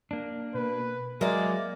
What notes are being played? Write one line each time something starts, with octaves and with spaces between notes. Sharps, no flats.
A#3 D4
B2 B4
F#3 G#3 A#3 D5 E5